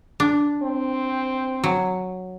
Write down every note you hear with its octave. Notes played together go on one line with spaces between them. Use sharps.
D4
C4
F#3